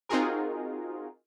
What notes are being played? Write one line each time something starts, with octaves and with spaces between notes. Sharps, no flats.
C4 D#4 F4 F#4 G#4 A#4